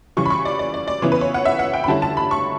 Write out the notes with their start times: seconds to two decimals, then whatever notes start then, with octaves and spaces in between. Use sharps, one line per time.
0.17 C#3 E3 G3 C#6
0.26 B5
0.30 C#6
0.45 D5
0.59 D5
0.74 D5
0.88 D5
1.02 C#3 E3 B3 E4 C#5
1.12 B4
1.21 C#5
1.34 F#5
1.45 E5
1.59 F#5
1.74 G5
1.84 B5
1.88 D3 G3 C#4 E4 A5
2.02 A5
2.17 B5
2.31 C#6